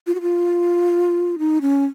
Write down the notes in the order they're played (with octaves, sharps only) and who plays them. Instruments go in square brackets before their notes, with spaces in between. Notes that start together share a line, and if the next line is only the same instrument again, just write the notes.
[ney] F4
F#4
F4
D#4
C#4